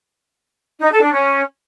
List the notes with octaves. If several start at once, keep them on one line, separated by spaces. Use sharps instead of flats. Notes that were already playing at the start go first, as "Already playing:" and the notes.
D#4
A4
D4
C#4